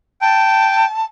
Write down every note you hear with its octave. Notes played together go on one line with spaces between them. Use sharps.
G5 A5